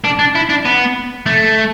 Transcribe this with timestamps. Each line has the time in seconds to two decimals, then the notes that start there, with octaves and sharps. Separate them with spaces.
0.04 D4
0.19 D4
0.35 E4
0.49 D4
0.65 B3
1.26 A3